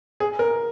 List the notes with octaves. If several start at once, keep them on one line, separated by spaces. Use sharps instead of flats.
G#4
A#4